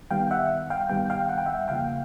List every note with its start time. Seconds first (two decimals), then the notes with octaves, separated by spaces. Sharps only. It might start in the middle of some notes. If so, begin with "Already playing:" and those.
0.11 G2 D#3 G3 B3 F5 G5
0.31 E5 F#5
0.70 F5 G5
0.89 G2 D#3 G3 B3 G5
1.10 F5 G5
1.29 F#5
1.38 G5
1.46 E5 F#5
1.68 E2 C#3 F3 A#3 F5 G5